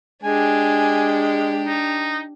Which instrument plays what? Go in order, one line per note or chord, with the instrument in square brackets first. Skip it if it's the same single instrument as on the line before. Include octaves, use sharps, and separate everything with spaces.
[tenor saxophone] G#3 [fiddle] D4 G4 [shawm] G#5
[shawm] D#4